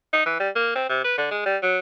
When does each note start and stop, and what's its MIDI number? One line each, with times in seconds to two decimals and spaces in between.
0.13 0.26 63
0.26 0.35 52
0.40 0.49 55
0.56 0.71 58
0.75 0.88 60
0.89 1.04 48
1.04 1.17 71
1.18 1.27 50
1.31 1.42 56
1.46 1.57 55
1.63 1.79 54